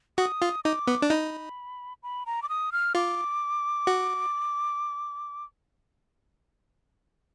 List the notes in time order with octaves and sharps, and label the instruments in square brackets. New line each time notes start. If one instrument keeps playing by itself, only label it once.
[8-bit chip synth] F#4 [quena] D#6
[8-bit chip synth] F4
[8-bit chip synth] D#4 [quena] D6
[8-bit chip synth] B3
D4
[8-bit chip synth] D#4 [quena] B5
[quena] B5
A#5
D6
D#6
F6
[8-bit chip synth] F4 [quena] D6
[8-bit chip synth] F#4